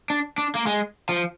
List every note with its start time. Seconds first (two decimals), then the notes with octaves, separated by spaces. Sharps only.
0.10 D4
0.38 D4
0.55 A#3
0.67 G#3
1.09 F3